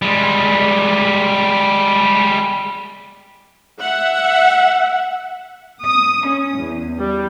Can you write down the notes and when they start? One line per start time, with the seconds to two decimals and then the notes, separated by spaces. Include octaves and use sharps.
0.02 G3 G#3
3.79 E5 F#5
5.85 D#6
6.26 C#4
6.57 E2
6.97 G3